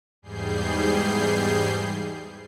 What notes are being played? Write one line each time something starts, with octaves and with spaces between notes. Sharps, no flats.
E2 G#2 G3 G#4 G6 C7